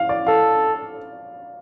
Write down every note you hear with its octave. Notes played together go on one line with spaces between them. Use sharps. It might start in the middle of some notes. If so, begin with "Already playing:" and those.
Already playing: F5
D5
A4 F5